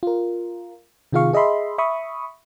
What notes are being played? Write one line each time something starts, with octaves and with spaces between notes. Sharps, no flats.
F4 A#4
C3 D#3 F4 G#4 F5 C#6
G#4 D#5 E5 B5 C6
E5 B5 C#6 D#6